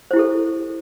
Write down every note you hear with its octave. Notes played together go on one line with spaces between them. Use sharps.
E4 G4 A4 C5